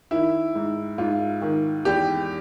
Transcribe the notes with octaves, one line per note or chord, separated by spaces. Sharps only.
D#3 E4
G#2
G#2 F4
D#3
E2 G4